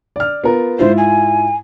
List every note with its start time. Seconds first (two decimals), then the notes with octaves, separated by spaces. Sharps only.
0.16 D5 F6
0.44 B3 F4 A#4
0.79 G#2 E4 F4 C5
0.98 G#5